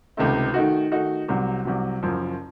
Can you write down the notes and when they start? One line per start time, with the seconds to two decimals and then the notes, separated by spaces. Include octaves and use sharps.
0.17 C#2 C3 D#3 A3
0.54 D#3 A3 D#4 F#4
0.92 D#3 A3 D#4 F#4
1.28 C2 C3 F#3
1.65 C2 C3 F#3
2.03 F#1 F#2 F3